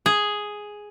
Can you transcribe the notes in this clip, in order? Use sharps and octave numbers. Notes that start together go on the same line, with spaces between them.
G#4